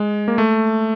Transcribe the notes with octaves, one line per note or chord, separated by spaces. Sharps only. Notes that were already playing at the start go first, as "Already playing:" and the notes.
Already playing: G#3
A#3
A3